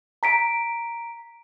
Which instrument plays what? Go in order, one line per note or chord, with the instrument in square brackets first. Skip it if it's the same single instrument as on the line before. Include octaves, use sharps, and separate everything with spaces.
[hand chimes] A#5 B6 D7